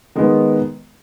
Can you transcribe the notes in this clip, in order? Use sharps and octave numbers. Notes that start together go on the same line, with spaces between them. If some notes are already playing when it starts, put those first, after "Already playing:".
D#3 G#3 B3